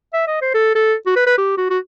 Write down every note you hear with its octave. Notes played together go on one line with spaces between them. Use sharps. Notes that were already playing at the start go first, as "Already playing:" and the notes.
E5
D#5
C5
A4
A4
F#4
B4
B4
G4
F#4
F#4